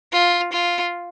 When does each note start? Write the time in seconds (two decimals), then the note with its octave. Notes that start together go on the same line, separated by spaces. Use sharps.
0.13 F4
0.53 F4